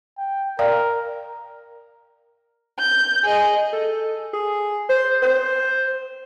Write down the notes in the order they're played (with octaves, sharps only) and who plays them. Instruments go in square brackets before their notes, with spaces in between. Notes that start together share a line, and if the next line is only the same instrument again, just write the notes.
[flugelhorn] G5
[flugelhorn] A#4 [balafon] D5 F5 G5
[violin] G6
G#4 D#5
[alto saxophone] A4
G#4
C5
C5